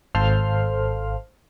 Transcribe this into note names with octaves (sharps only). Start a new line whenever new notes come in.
G#1 A4 C5 F5 C6 F6